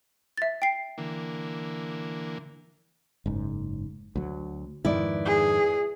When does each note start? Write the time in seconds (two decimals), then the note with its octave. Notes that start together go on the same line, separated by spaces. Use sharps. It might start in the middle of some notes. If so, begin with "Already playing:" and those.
0.37 E5 A6
0.62 G5 C7
0.98 D3 E3 A#3
3.26 F#1 G#2
4.16 D2 F#3
4.85 F2 G#2 D#3 E4 B4 D5
5.26 G#4